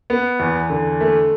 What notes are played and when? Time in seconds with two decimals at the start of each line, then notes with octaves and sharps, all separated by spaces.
0.10 B3
0.40 E2
0.70 D3
1.01 A3